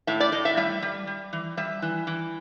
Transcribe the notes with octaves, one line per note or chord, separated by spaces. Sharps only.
A2 E5
D5
A2 D#5
E5
G3 E5
G3
G3
E3
G3 E5
E3
E3